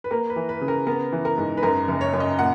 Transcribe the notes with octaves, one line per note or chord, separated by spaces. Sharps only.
B4
A#3 A#4
B4
E3
B4
C#3
A#4
B3 A#4
E3
A#4
G#2
B4
F#2 A#4
F#1
C#5
F#2
D#5
A#2 F#5